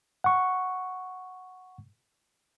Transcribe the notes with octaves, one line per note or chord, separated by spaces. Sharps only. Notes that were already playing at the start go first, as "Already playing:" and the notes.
F#5 C#6